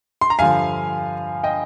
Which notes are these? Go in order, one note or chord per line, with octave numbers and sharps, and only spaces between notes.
C6
A#5
G2 D3 F3 F5 G#5
D#5 G5